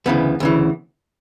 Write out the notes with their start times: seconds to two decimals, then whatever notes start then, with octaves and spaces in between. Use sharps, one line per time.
0.06 D2 C#3 E3 B3
0.40 D2 C#3 E3